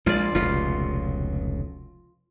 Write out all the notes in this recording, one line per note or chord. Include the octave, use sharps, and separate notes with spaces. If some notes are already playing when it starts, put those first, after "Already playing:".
A#1 G#3 F4 D5
F1 C#2 B2 F4